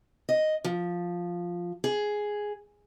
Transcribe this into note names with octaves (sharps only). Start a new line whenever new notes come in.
D#5
F3
G#4